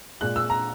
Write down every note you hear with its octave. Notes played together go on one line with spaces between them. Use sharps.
A#2 G#3 F#6
E6
A#5